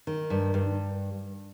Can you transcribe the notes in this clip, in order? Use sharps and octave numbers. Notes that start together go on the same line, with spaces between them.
D#3
G2
G2